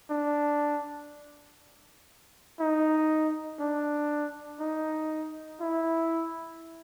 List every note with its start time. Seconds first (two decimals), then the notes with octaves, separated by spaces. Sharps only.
0.10 D4
2.60 D#4
3.60 D4
4.60 D#4
5.60 E4